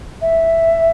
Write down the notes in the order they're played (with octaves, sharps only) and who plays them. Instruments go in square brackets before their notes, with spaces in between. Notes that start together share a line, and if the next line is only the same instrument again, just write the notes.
[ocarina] E5